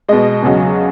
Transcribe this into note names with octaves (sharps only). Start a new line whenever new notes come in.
B2 G#3 D#5
E2 C#3 F#3